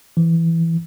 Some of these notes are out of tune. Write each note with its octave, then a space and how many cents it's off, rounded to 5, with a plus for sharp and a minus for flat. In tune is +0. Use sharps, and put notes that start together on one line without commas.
E3 +5